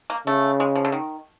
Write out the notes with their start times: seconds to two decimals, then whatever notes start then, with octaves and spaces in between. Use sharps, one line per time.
0.10 A#3
0.27 C#3 A3
0.60 G#3
0.76 F3
0.85 D3
0.92 D#3